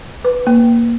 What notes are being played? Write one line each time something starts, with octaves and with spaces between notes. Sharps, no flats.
B4
A#3